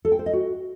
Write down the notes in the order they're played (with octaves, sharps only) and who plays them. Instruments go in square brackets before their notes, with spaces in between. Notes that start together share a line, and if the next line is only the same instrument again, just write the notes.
[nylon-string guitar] A4
G5
C5
D#5
F#4